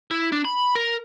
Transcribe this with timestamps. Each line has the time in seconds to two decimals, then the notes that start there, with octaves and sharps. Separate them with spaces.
0.11 E4
0.32 D4
0.45 B5
0.75 A#4